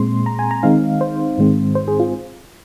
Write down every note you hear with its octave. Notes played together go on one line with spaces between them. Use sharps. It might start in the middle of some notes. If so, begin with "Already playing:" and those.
Already playing: A#2 G#3 C4 C6
A#5
G#5
A#5
D#3 G#3 C4 D#4 F5
C5
G#2 D#3 G#3 C4
C5
G#4
F4